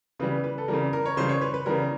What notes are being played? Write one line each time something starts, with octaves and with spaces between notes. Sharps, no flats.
C#3 E3 G3 B4
B4
A4
C#3 E3 G3 A#4
A#4
C#5
C#3 E3 G3 C5
C#5
B4
B4
C#3 E3 G3 A#4